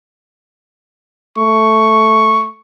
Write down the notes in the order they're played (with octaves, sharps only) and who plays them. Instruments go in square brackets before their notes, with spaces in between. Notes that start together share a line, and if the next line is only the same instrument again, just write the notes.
[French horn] A3 [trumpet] C#6